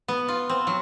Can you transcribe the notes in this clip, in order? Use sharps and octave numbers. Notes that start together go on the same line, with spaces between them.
B3
F4
C4
F#3